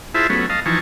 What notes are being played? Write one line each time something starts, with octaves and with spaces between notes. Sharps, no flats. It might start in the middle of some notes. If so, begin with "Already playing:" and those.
E4 F4 G#4 C5 E5 A5
F#3 A3 B3 C#4
D#5 F5 A5
E3 F3 D#4 G#5 A5 C#6